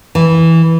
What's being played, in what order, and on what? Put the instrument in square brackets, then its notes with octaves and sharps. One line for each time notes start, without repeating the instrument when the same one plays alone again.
[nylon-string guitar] E3